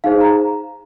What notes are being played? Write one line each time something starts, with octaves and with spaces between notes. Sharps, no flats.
D#4 G#4 C5 F5
A#5